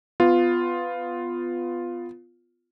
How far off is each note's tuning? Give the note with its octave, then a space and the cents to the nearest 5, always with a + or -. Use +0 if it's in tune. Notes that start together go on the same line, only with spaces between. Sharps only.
B3 +20 F4 +0